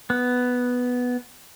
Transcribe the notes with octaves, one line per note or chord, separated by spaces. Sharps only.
B3